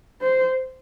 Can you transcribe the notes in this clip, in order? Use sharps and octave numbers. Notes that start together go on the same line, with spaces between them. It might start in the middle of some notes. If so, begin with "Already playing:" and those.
C5